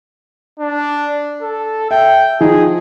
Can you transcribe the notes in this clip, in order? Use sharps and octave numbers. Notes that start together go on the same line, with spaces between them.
D4
A4
E5 G5
F3 D#4 G#4